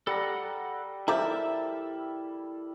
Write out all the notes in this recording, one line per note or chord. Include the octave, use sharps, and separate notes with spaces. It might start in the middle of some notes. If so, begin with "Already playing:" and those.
G3 A4 F#5 A#5
F3 E4 G4 A4 A#4 E5 A#5